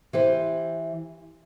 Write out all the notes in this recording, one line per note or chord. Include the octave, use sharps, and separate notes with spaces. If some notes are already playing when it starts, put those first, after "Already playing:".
E3 G4 C5